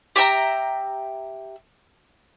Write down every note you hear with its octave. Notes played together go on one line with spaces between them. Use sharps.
G4 E5 G5 A#5